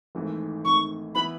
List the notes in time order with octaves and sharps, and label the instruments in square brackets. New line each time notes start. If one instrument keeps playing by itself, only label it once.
[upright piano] G#1 G#2 E3 A3
[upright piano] G#1 G#2 E3 A3 [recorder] C#6
[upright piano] E3 B3 E4 B4 [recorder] B5